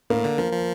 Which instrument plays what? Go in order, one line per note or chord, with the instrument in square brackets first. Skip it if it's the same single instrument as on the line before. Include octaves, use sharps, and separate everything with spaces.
[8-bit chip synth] A2 [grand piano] A#3
[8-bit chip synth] D3
[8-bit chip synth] F3 [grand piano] A#3
[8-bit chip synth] F3